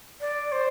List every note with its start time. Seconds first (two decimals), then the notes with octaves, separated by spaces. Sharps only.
0.21 D5
0.52 C5